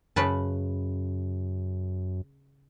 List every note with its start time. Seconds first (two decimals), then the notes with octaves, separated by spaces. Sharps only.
0.16 F#2 C#3 B4 A5